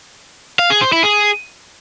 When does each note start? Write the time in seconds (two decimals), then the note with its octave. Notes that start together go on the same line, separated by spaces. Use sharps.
0.59 F5
0.70 G#4
0.81 C5
0.92 E4
1.04 G#4